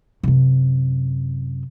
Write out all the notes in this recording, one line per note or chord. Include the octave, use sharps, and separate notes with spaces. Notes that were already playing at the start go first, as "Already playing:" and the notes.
F#2 C3